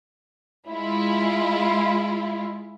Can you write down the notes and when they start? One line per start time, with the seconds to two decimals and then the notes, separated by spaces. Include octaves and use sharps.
0.68 G#3 E4 F4